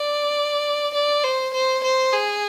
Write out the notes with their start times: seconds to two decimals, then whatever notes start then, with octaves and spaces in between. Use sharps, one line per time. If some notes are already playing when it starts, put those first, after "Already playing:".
Already playing: D5
0.94 D5
1.24 C5
1.54 C5
1.84 C5
2.13 G#4